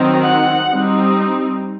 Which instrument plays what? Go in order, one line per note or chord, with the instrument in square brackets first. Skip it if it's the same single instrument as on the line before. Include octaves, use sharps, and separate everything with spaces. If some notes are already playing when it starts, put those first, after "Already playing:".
Already playing: [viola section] D#3 F#3 C4 D#4
F#5
G3 C4 D#4